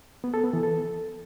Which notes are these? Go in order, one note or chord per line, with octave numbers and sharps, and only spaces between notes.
B3
A4
B3
E3
A4